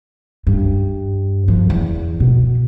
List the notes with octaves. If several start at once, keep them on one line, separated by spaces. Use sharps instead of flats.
G2
F3
E2
B2